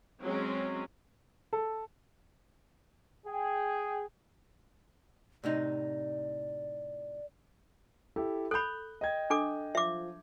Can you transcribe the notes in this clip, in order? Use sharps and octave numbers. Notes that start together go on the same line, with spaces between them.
F#3 G#3 C4 C#4
A4
G#4 G5
A2 C3 D#4 D5
E4 G4 A4
A4 B5 F#6 G6
D#5 G5 G#6
D4 A4 D6
F3 E5 D6